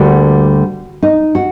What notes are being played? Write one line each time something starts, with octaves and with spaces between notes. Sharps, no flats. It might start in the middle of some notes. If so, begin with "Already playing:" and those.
Already playing: D2 D3 G3 A#3 F#4
D#4
F#4